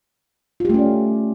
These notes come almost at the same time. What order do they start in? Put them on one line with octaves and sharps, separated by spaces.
F4 G4 A3 C#4 D5